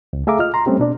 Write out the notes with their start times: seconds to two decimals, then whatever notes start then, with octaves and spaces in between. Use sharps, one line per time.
0.13 C#2
0.27 A3 G#4 E5 F5 A#5 D6
0.39 F4 D#5 F6
0.54 A#5 C6
0.66 G3 A3 C4 C#4 G4
0.80 B2 D4 D5